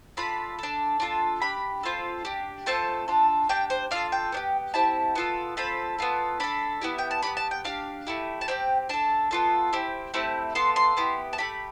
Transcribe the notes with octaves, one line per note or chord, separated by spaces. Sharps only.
D4 F4 A4 B5
D4 A4
D4 F4 A4
D4 G4 B5
C4 F4 A4
D4 G4
A3 C4 F4 A4 A5
D4 F4 A4
D4 G4 G5
C5
D4 F4 A4 F5
G5
B3 D4 G4
C4 E4 G4 A5
B3 F4 A4
C4 F4 A4 B5
B3 F4 A4
D4 A4 B5
B3 E4 G4
G5
A5
B3 D4 G4 B5
A5
G5
D4 G4 F5
A3 E4 G4
A5
C4 E4 G4 G5
D4 A4 A5
B3 F4 A4
C4 E4 G4
A3 C4 E4 G4
B3 F4 A4 C6
C6
B3 E4 G4
A5
A3 D4 G4 B5